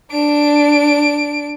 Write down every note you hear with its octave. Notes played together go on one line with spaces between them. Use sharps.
D4 D7